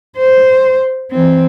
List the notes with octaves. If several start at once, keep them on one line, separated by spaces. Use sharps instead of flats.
C5
E3 C4